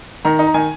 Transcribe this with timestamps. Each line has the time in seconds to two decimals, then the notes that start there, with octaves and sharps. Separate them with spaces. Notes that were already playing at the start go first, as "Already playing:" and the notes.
0.25 D#3 A#5
0.39 D#4
0.47 A#5
0.54 D#3 G#5